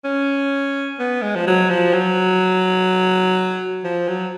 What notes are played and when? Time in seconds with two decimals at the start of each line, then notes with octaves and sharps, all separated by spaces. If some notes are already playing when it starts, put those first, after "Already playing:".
0.04 C#4
0.99 B3
1.22 G#3
1.35 F3
1.47 F#3
1.70 F3
1.93 F#3
3.84 F3
4.08 F#3